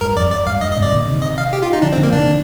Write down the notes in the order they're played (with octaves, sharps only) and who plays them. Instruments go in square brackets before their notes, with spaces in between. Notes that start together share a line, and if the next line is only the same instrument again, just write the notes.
[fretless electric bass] G2 [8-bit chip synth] A#4
[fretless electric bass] F2 [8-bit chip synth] D5
[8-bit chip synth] D5
[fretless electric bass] G2 [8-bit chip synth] F5
[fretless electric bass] G2 [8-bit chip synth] D#5
[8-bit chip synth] D#5
[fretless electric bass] G#2 C3
[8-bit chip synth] D5
[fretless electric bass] A#2 D3
C3 D#3
[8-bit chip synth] D#5
F5
G4
F4
D#4
[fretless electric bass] D3 F3 [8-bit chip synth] D4
[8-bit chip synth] C4
[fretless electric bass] D3 F3
[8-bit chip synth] A#3
[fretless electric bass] C3 D#3 [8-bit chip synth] D4
[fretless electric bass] D3